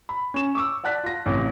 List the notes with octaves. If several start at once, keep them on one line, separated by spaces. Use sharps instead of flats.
B5
C#4 E7
C#6 D6 E6
D5 F#5 A5 F#6 B6
F4 A#6
A1 C3